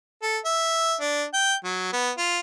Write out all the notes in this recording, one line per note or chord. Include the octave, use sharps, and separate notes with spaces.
A4
E5
D4
G5
F#3
B3
F4